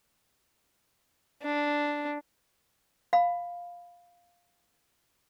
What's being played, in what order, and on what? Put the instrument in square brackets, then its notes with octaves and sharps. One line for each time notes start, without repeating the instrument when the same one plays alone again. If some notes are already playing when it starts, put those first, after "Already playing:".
[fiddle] D4
[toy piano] F5 B5